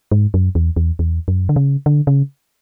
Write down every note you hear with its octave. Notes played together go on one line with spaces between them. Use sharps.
G#2
F#2
E2
E2
E2
F#2
D3
C#3
D3
C#3